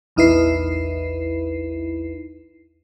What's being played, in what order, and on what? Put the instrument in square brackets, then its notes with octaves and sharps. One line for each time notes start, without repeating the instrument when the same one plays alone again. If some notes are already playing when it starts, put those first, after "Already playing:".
[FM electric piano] A#1 E2 D#4 E4 B4 C7